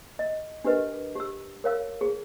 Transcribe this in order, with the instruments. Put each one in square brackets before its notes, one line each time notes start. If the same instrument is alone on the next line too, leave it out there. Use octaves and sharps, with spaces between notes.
[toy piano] D#5
D4 G4 A#4 B4 D#5
G4 E6
A#4 C#5 F5 E6
G#4